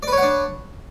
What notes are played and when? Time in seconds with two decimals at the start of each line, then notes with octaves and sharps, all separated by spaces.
0.03 D5
0.08 B4
0.13 C#5
0.18 F#5
0.22 D4